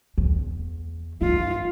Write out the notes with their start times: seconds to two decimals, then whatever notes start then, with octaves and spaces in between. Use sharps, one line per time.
0.18 E2
1.21 G2 F4